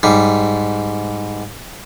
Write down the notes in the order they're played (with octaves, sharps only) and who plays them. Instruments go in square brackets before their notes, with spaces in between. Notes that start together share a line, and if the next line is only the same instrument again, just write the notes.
[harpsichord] G#2 G3